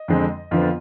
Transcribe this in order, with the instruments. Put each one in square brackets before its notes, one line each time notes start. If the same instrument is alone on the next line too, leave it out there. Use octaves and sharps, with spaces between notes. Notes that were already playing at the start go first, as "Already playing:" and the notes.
Already playing: [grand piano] D#5
F2 D3 G#3 C4
F2 D3 F3 B3 F4